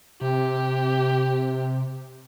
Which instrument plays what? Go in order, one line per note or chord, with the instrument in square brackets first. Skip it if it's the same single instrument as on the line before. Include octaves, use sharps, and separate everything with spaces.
[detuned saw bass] C3 [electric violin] G4